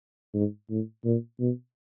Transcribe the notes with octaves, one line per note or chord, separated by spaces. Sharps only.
G#2
A2
A#2
B2